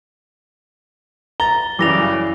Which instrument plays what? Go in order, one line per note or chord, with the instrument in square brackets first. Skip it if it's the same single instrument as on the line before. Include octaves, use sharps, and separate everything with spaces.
[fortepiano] A#5 [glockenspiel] A6 G7
[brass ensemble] F#2 C#3 G3 [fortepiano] E3 [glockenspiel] D6 A#6 F7